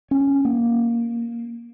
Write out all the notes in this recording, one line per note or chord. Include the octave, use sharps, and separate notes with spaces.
C#4
A#3